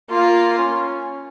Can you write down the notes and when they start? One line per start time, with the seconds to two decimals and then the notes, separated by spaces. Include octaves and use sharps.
0.10 A#3 F4
0.58 C#4